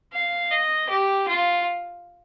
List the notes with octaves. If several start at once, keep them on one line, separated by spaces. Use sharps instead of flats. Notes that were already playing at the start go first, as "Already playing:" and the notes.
F5
D#5
G4
F4